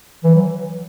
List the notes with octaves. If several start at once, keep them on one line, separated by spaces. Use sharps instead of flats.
E3
F#3